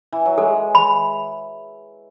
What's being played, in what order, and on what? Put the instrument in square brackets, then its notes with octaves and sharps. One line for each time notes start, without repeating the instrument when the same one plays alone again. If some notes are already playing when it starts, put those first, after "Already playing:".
[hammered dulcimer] E3
F#3
[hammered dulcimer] G#3 [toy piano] A4
[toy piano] B5